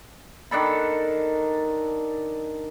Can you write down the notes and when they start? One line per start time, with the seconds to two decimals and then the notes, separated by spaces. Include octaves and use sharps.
0.51 D#3 D4 A4 B5